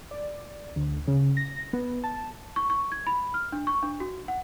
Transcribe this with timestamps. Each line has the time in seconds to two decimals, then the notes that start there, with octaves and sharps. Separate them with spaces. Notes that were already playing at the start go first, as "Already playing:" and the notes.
0.11 D5
0.76 D2
1.07 C#3
1.37 A#6
1.73 B3
2.04 A5
2.56 C#6
2.70 C#6
2.92 G#6
3.07 B5
3.34 F6
3.52 D4
3.67 C#6
3.83 D4
4.00 F#4
4.28 F#5